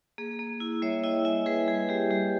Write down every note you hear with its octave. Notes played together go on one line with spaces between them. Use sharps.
A#3 G#4
A#3
E4
G3 C#5 E5
E4 D#5 G5
E4 E5 G#5
G3 G#4 B4
G3 G#4
G3 G4
G3 G4